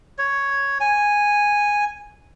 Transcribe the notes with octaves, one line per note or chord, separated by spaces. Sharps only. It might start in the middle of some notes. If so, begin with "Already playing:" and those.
C#5
G#5